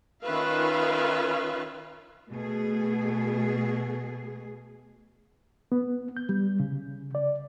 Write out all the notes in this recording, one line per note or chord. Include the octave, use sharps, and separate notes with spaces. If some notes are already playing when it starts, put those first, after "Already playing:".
D#3 C#4 F4 B4 E5 F5
B2 A3 G#4
B3
G6
G3
C#3
D5